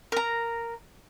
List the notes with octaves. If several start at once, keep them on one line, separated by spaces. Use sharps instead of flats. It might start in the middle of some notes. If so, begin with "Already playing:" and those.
A#4 A#5